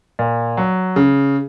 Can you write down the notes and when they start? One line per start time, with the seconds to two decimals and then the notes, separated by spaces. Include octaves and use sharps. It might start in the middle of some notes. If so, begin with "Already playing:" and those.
0.19 A#2
0.57 F#3
0.96 C#3